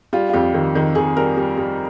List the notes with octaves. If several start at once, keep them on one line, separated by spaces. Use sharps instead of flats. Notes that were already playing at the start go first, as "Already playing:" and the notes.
G3 F4
F4
F2 G4
D#3
D#3
D#3 G#4
G3 A#4
G3
G3